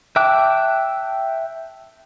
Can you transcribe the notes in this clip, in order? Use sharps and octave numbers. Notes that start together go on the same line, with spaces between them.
E5 G5 A5 D6 F#6